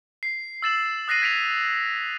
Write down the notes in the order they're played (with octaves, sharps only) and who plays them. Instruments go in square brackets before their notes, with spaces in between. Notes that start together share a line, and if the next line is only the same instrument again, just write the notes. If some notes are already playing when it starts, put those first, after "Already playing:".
[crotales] C7
E6 A6 E7 F#7
D#6 F#6 A#6 C7 D#7
G#6 B6 D7 F7